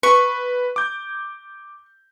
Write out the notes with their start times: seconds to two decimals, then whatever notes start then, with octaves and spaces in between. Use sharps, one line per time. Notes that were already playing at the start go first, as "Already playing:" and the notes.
0.03 B4 C#6
0.76 D6 G6